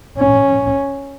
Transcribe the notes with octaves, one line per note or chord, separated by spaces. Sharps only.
C#4